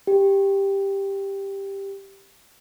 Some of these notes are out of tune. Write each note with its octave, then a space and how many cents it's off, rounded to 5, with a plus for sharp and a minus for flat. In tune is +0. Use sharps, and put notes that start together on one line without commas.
G4 +5